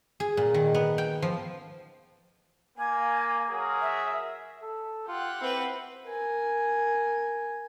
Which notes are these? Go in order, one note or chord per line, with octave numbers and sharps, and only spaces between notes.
G#4
A#2
D#3
B3
G5
F3
A#3 G#5
F#3 G#4 A#4
E5
A4
F4 G4 F#5
C4 E4 B4
A#4 G#5